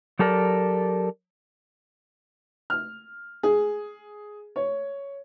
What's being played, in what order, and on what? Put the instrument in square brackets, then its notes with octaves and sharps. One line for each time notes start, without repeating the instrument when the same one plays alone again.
[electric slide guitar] F#3 G4 A4 A#4 D5
[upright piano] F6
G#4
C#5